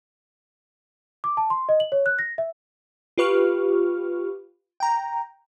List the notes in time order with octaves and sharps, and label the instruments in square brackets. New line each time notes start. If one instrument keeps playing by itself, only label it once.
[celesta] D6
A5
C6
D#5
F#7
C#5
F#6
A#6
E5
[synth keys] F4 G4 B4 C#6 F6
G5 A#5